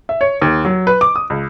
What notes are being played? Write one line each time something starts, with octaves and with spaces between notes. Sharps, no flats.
E5
C#5
D#2
F#3
B4
D6
D#6
C#2